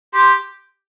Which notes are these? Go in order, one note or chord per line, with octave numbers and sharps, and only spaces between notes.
G4 C6